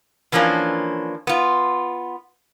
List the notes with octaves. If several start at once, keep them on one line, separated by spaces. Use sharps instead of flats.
E3 F3 A#3 C#4 D4
B3 F4